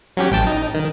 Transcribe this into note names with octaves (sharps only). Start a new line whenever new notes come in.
F#3 C#4 G4
A1 G5 A5
D#4
D#3